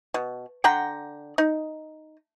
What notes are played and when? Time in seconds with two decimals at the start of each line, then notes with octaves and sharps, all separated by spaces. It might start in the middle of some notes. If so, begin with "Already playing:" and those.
0.14 B2
0.64 D3 F#5 G5 A#5
1.38 D#4